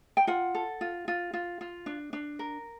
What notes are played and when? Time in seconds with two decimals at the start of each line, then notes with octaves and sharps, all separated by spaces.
0.17 G5
0.27 F4 F#5
0.55 A4
0.81 F4
1.08 F4
1.33 F4
1.61 F4
1.86 D4
2.13 D4
2.39 A#4